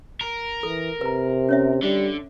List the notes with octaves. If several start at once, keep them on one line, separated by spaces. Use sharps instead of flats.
A#4
E3 A4
C3 B4 A#5
C#4 C#5 E5
D3 G3